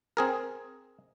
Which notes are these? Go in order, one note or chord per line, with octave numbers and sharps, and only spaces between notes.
C4 G#4 A#4